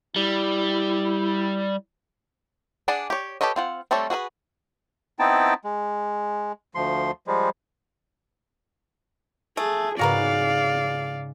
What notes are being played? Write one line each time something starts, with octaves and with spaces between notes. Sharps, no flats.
G3 E4
D4 G#4 D5 F#5
G4 C#5
G4 A4 B4 C#5 D#5
C4 F4 F#5
G3 A3 C4 A4 C#5
F#4 G#4 A4 B4
B3 C4 D#4 E4 G5 A5
G#3
D2 F3 C6
F3 G3 G#3
A3 G#4
G#2 C#3 F#4 A#4 B4 D5 F5